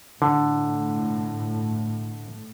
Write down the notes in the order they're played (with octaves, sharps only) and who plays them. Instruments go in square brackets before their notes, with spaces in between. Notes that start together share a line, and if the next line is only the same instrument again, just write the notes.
[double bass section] A2 [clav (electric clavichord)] D3